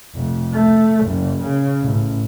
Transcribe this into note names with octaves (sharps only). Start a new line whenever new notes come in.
F1
A3
F#1
C#3
A1